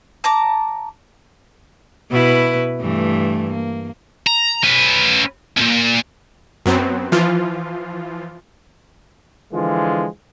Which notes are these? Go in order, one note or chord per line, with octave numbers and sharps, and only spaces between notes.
A5 A#5 D6
B2 E4 B4
G2 E3 A3
A#3
A#5
C#4 B4
B1 A#2
F#2 F#3 B3 C4
E3 F3 F4
D3 E3 F3 G#3 F4